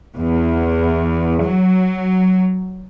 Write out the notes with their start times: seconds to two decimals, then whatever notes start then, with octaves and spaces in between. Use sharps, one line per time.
0.18 E2
1.43 F#3